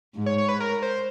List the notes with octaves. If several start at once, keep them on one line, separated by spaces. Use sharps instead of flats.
G#2
C#5
C#5
B4
A#4
C5